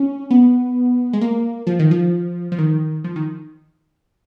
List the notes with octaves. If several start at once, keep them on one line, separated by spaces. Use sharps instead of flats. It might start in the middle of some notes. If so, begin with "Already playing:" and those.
Already playing: C#4
B3
G#3
A#3
F3
D#3
F3
F3
D#3
F3
D#3